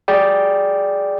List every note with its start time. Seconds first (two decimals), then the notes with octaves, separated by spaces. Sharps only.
0.08 G#4 D5 G5